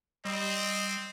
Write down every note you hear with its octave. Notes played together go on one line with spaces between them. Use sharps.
G3 C4 D#5